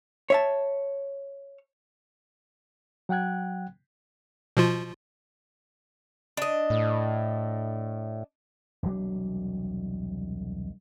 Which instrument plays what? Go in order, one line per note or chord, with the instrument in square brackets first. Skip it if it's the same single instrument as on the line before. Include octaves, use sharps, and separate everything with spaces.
[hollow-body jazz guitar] C#5 E5 A5
[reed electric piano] F#3 F#5 G5 F#6 G#6
[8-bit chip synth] B2 F3 F4
[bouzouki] D4 D#5
[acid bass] A2
[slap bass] E1 C2 F#3 D4